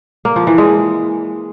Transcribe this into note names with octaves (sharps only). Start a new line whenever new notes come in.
A#3
F3
E3
G#3